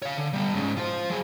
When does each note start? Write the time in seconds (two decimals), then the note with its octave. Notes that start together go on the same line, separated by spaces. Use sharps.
0.02 C#5 F5
0.18 D3
0.33 G3 B3
0.54 G#2 C#3
0.77 F4 C5
1.10 F#3 G#4